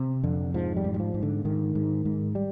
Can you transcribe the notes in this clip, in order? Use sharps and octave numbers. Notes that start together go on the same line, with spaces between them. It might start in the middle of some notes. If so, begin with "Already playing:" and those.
Already playing: C3
F2 D3
G#2 F3
G3
G#2
G3
F3
G#2
D3
G#2 D#3
G#2
G#2
G3